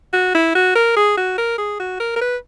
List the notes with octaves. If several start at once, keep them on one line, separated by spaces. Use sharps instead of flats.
F#4
E4
F#4
A#4
G#4
F#4
A#4
G#4
F#4
A#4
A#4
B4